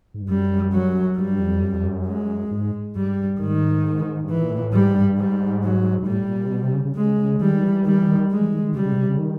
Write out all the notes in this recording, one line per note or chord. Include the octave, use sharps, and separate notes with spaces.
G#2
G2
F#2 G3
F#3
G2 G3
F2
F#2
F2
F#2
G#3
G#2
G2 G3
G#2 D#3
G2
G#2 E3
A#2
A2
A#2
A2
G#2 G3
G2
G#2 G3
F#3
G#2
A2 G3
A2
A#2
C3
B2
C3
C#3
C#3
C#3 G#3
D#3 G3
E3
D#3 G3
E3
D#3
G#3
E3
D#3
D#3
C#3 G3
C#3
B2
C3
C#3
D#3